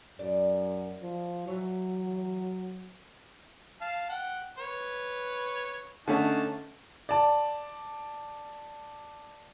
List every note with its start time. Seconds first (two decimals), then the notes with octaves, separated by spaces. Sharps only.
0.19 F#2 D5
1.03 F3
1.47 E3 F#3 C#5
3.81 F5 A5
4.10 F#5 G5
4.59 B4 C#5
6.08 D3 A3 C#4 D#4 F#5 A5
7.09 D5 A5